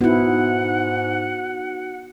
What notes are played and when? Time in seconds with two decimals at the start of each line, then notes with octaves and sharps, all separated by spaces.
0.01 G#2 B3 D#4 E4 F#4 F#5